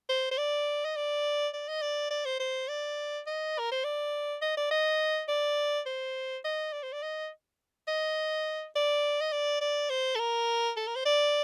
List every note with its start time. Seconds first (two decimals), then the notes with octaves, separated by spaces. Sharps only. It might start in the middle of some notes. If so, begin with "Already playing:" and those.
0.09 C5
0.32 C5
0.38 D5
0.85 D#5
0.96 D5
1.53 D5
1.68 D#5
1.82 D5
2.10 D5
2.25 C5
2.40 C5
2.68 D5
3.26 D#5
3.59 A#4
3.72 C5
3.84 D5
4.42 D#5
4.57 D5
4.71 D#5
5.28 D5
5.86 C5
6.45 D#5
6.73 D5
6.83 C5
6.93 D5
7.02 D#5
7.88 D#5
8.75 D5
9.21 D#5
9.32 D5
9.61 D5
9.90 C5
10.15 A4
10.19 A#4
10.76 A4
10.87 A#4
10.96 C5
11.05 D5